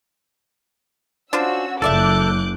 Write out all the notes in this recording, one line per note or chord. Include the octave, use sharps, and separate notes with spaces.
C#4 D4 F4 F#4 C5 E6
F#1 F4 A4 D5 E5 D6 F#6 G6